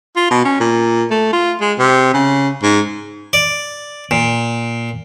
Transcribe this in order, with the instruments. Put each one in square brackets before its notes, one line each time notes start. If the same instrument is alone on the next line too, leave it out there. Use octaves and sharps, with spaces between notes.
[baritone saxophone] F4
B2
C#4
A#2
A3
F4
G#3
C3
C#3
G#2
[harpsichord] D5
A#2